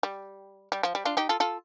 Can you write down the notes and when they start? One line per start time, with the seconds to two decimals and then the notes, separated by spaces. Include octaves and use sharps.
0.03 G3
0.72 G3
0.83 F3
0.95 G3
1.05 D4 F4
1.17 D#4 G4
1.29 F4 A4
1.40 F4 A4